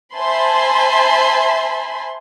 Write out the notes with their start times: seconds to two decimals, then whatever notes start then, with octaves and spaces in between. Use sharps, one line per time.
0.16 C5 E5 G#5 A5 B5 C6